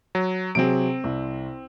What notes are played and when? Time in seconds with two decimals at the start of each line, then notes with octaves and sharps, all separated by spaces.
0.15 F#3
0.55 C3 F#3 C4 G#4 D7
1.04 C2